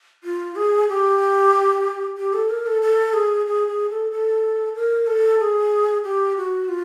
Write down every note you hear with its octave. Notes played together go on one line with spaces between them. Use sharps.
F4
G#4
G4
G4
A4
A#4
A4
A4
G#4
G#4
G#4
A4
A4
A#4
A4
G#4
G4
F#4
F4